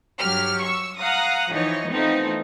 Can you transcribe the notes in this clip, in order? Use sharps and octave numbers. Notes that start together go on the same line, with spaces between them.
G2 F#3 G4 F6
C#6 E6
F5 F#5 A#5 D#6
E3 F3 D#4 C#5 D#5
E3 F3 A3 B3 C4 D#4